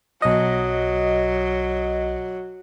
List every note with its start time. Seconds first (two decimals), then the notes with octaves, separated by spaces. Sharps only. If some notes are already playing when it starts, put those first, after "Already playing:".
0.22 B1 F#3 D#5